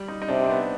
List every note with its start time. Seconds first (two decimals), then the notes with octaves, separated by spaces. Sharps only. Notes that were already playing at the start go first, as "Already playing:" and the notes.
Already playing: G3
0.08 D#4
0.22 D#4
0.28 C3 D4
0.44 C4
0.50 B3